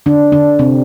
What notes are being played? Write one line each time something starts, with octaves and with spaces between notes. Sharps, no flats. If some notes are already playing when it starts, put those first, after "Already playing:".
D3 D4
D3 D4
C3 C4